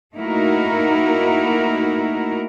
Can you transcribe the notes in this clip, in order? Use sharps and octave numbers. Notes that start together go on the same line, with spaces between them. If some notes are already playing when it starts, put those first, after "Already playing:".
A3 A#3 D#4 E4 F#4 A#4